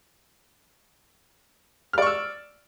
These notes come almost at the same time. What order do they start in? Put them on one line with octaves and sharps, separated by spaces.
F6 D5 C#6 E6